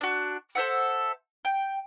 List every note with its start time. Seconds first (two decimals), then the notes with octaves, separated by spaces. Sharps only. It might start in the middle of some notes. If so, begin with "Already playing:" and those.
0.01 D4 F#4
0.55 A4 C5 E5 F#5
1.45 G5